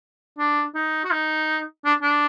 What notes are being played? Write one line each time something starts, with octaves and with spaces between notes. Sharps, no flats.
D4
D#4
F#4
D#4
D4
D4